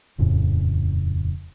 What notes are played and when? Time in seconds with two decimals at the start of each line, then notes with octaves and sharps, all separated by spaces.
0.18 D#1 F2 A2 C#3